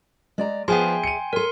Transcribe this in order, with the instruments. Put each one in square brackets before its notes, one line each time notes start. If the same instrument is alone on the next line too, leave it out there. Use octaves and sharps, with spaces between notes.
[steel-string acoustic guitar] G#3 D5 A#5
[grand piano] F3 B3 [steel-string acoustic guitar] G#4 E5 [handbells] G5 G#5 C6
[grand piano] C#7 D#7
[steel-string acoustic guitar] A4 C#5 [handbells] A#4 C6